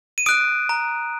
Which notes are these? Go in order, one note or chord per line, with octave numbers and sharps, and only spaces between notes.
D#7
D#6 F#6 D7
A#5